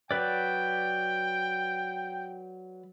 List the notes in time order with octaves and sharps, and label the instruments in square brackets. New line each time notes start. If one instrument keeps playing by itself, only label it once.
[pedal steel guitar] F#3 B4 D5 [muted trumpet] G5